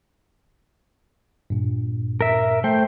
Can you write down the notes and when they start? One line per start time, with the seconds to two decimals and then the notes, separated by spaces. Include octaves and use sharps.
1.50 G2 A#2
2.21 A#4 E5
2.64 A3 C5 G5